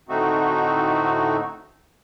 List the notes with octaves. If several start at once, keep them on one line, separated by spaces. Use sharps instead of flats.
A2 D3 A3 C4 D#4 F#4